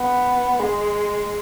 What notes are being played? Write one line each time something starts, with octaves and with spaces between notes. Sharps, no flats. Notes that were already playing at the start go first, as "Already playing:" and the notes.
Already playing: B3
G#3